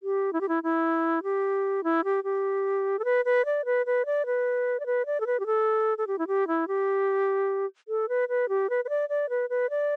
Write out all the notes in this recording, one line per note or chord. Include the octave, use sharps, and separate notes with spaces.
G4
E4
G4
E4
E4
G4
E4
G4
G4
A4
B4
B4
D5
B4
B4
D5
B4
D5
B4
D5
A4
B4
G4
A4
A4
G4
E4
G4
E4
G4
A4
B4
B4
G4
B4
B4
D5
D5
B4
B4
D5